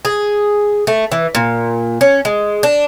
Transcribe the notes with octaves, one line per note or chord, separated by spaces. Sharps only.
G#4
A3
E3
A#2
C#4
G#3
D4